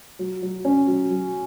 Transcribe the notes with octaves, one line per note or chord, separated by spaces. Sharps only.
F#3
F#3
C#4
F#3
F#3